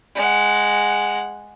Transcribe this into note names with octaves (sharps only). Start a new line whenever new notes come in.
G#3 F#5